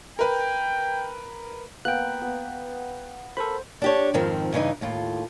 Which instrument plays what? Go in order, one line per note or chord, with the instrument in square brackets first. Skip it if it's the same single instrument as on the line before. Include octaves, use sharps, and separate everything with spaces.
[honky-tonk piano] A#4 B4 [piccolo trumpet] G5
[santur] A#3 B3 A#4 [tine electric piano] G5 F#6
[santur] B3
[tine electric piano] A4 A#4 B5 [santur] C5
[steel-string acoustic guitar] D4 G4 C#5
F2 G#2 D#3 F3 C4
G2 C#3 E3 D#4
D#2 A2 F4